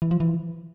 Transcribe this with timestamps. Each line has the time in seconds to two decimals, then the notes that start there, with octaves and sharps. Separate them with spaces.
0.02 E3
0.11 F3
0.20 E3